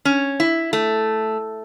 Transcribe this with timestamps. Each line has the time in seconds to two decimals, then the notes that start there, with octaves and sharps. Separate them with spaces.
0.05 C#4
0.40 E4
0.73 A3